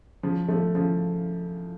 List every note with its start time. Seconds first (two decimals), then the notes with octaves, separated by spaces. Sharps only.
0.23 C#3 F3
0.48 F3 A3
0.75 C#3 F3